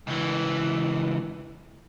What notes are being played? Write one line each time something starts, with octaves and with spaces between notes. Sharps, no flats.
C#2 E3